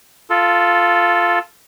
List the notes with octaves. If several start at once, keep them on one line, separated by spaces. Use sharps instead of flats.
F4 A4